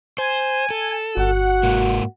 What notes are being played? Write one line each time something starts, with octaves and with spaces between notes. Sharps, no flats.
C5 G#5
A4
G1 F#4 F#5
G#2 A#3